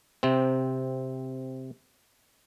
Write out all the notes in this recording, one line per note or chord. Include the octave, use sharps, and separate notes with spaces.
C3 C4